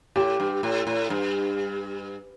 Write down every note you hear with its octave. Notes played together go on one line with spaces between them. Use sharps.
A2 G4
G2
A2
A2
G2